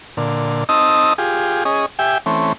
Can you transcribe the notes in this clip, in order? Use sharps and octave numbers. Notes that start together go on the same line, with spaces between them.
A#2 D3
C4 D#4 D#5 A5 D#6 E6
F4 G4 G#4
C#4 G#4 D#5
G4 E5 G5 G#5
E3 A3 C4 C#4